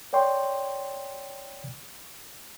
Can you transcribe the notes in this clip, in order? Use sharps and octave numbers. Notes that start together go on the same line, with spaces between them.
C#5 D5 G5 C6 C#6